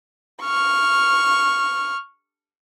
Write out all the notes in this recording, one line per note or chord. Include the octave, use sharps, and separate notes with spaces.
C#6 F6